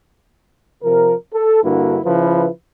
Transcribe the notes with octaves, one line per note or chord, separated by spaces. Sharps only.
C3 F3 A#4
A4
G2 D3 A#3 E4 F#4
C#3 F3 E4 B4